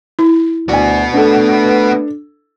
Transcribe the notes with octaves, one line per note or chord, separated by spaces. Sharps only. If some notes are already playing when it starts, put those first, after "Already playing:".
E4
D2 B3 F#4 D5 G#5
A3 D4 A4 B4